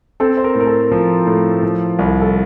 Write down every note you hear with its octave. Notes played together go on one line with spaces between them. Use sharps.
C4 A4
C5
A#4
A2
A#4
A4
F3
A2
F3
C2
A4